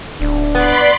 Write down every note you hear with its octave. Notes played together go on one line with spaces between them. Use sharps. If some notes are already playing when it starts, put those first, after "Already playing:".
D1 D4
B3 D5 B5 C6